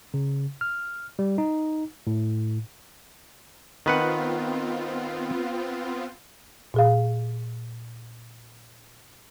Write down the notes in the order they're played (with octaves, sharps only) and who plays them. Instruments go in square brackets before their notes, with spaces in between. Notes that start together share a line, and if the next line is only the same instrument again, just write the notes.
[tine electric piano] C#3
F6
G3
D#4
A2
[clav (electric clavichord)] D#3 B4 F#5 [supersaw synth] B3 C4 F4
[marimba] A#2 G#4 F5